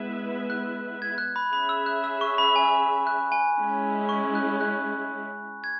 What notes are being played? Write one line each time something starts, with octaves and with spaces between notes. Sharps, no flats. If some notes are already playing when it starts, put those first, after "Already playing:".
Already playing: G#3 B3 E4 B4 E5
F#6
G#6
F#6
B5
C#4 G#4 E5 B5
E6
F#6
E6
C#6
B5
G#5
F#6
G#5
G#3 C#4 E4
C#6
F#6
F#6
G#6